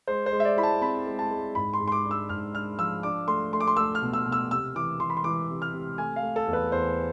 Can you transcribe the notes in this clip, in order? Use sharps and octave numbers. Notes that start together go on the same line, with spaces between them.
G#3 C5
C5
G#3
E5
D5
E4 B5
A5
C4 B5
G#3
A5
G#3
G#2 B5
C6
G#2
C6
D6
D4
E6
G#2 F6
D4 F6
F3 E6
D4 D6
A3 C6
A3 C6
D6
C6
A3 E6
F6
B2
E6
B2
E6
C3 E6
E3 D6
E3 C6
B5
C6
E3 D6
C3
F6
C3
A3 G#5
F5
A3
A4
E2
B4
E2 C5